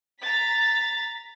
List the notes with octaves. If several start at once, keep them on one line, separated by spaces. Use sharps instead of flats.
A#5 A6 B6